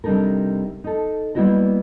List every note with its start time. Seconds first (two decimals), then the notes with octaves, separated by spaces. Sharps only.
0.04 C3 G3 D4 D#4 A4 A#4
0.84 D#4 A4
1.35 G3 A#3 B3 E4 F#4 D#5